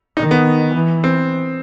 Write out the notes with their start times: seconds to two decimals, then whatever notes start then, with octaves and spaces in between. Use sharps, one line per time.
0.17 D#3 D#4
0.31 B3
0.75 E3
1.04 C4